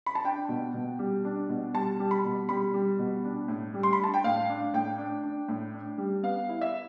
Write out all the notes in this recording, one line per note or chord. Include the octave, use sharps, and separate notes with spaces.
B5
A5
D4 G5
B2
B2
G3
D4
B2
G3 A5
G3
B5
B2
G3 B5
G3
B2
D4
A2
G3
C6
B5
D4
A5
G5
A2 F5
D4
A2 G5
D4
D4
A2
D4
G3
B3 F5
E4
E5